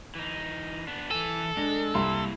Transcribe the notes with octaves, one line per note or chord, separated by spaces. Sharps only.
E3 D#4
B3 D4
E3 A4 G#5
G#3 D4
C2 A#3 E4 C6